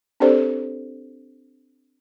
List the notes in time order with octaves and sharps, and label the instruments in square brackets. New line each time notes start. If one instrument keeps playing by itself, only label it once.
[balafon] C4 D4 G4 A4 C5 D5